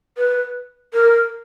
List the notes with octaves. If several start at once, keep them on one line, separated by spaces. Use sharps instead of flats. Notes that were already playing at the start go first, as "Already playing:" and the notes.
B4
A#4